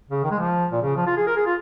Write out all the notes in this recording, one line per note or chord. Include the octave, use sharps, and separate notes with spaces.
C#3
D#3
G#3
F3
A#2
C#3
F3
F4
G#4
A#4
G#4
F4